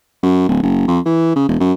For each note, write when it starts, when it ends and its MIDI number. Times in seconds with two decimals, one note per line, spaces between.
0.23 0.47 42
0.48 0.61 26
0.63 0.83 30
0.88 0.99 41
1.06 1.33 52
1.36 1.45 49
1.48 1.58 28
1.60 1.72 42